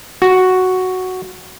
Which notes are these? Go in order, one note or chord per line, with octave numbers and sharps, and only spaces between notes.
F#4